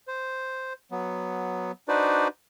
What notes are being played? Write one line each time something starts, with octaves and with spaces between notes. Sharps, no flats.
C5
F#3 B3
D4 D#4 F#4 B4 C5 D5